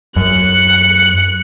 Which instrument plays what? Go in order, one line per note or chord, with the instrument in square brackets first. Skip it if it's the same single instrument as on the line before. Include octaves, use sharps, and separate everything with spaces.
[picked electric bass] F#2 [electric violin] F#6 C#7